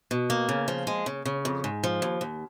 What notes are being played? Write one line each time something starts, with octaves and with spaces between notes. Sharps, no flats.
B2
A#3
C#3
F3
G#3
C#3
C#3
F2
G#2
F3
D#2
D#2